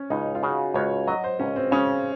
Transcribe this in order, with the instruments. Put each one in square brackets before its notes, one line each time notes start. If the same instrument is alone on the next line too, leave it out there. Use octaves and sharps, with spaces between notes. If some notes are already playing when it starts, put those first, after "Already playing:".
Already playing: [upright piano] C#4
[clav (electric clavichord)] C#2 [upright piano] D#4
[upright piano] F4
[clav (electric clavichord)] C#3 [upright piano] F#4
[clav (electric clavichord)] C#2 [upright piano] C#5
[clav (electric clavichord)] F#3 [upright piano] D#5
[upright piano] C5
[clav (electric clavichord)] C#2 [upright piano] C#4
[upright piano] C4
[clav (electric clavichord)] C#3 [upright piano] C#4